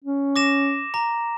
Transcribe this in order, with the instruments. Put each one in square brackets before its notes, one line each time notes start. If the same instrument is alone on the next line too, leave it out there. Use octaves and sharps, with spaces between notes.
[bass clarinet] C#4
[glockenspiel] D6 A#6 E7
A#5